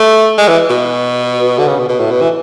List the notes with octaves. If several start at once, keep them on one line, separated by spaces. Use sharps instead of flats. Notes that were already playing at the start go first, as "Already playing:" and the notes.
Already playing: A3
G#3
E3
B2
D3
C#3
B2
B2
A2
B2
E3